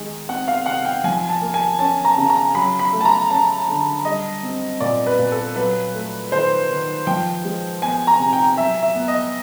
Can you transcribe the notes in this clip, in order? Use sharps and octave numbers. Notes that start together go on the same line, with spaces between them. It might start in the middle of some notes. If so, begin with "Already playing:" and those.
Already playing: D#3 G#3
C4 F#5
F5
C3 F#5
G5
F3 G#5
A5
A#3
G#5
C#4 A5
A#5
C#3
A#5
F#3 B5
B5
A3
A5
A#5
C#4 A5
D3
G3 D#5
C4
A#2 D5
B4
A#2
A4
F#3 B4
A3
D#3 C5
D#3
F3 G5
G#3
B3 G#5
A#5
C3
G5
F#3 E5
E5
B3
D#5